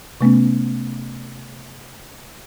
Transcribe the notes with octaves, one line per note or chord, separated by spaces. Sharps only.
C3 A3 B3 C#4